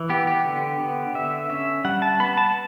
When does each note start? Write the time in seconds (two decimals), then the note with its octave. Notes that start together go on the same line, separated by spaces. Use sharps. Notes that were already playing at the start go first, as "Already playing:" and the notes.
Already playing: E3
0.09 B3 G4
0.27 G4
0.45 D3
0.80 B3
1.14 D3 E5
1.50 C#4 E5
1.85 G3 F#5
2.02 A5
2.20 B3 B5
2.37 A5